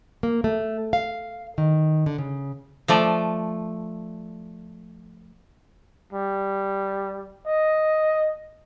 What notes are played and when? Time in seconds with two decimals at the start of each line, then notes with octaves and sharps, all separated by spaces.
0.23 A#3
0.44 A3
0.93 F5
1.58 D#3
2.06 D3
2.18 C#3
2.88 F3 A3 D5
6.13 G3
7.46 D#5